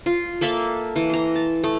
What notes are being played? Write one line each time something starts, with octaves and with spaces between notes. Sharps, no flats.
F4
A#3 A4 E5 F5
E3
A#5 C6
A5
A3